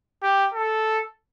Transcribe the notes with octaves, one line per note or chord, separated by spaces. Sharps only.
G4
A4